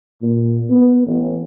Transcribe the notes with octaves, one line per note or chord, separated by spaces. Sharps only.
A#2
B3
A1